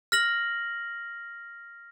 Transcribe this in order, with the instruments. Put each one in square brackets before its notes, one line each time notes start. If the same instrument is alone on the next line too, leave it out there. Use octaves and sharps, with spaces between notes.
[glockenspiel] F6 A#6 F#7